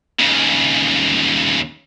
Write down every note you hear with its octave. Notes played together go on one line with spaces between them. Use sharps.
D#2 C#3